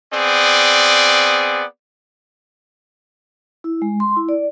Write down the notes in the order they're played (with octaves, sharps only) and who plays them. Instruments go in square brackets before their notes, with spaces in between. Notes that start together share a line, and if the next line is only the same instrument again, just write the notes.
[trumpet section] B3 C4 G#4 D5
[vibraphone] E4
G#3
C6
E4
D5